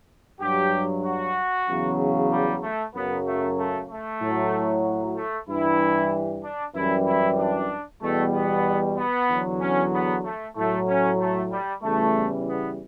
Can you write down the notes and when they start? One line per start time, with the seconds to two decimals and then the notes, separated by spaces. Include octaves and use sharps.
0.40 G2 F#3 G4
1.04 F#4
1.68 E2 C#3 F#3
2.31 G3
2.63 A3
2.94 F#2 C#3 F#3 B3
3.26 A3
3.58 A3
3.90 A3
4.21 A2 F#3
5.16 A3
5.48 G2 E3 G3 E4
6.43 D4
6.75 F#2 E3 G3 E4
7.07 E4
7.38 D4
8.02 E2 B2 G3 A3
8.33 B3
8.97 B3
9.29 E2 D3 F#3
9.60 C#4
9.93 B3
10.24 A3
10.56 A2 F#3 A3
10.88 C#4
11.19 A3
11.51 G3
11.82 E2 C#3 E3 G3 A3
12.46 B3